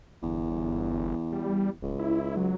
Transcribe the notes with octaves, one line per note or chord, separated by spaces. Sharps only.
G1 E2
G3
D1 C#2
E4
F#3